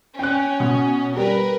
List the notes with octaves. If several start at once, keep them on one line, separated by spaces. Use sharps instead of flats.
C#4 G5 F#6
B2
G3 A#4 B4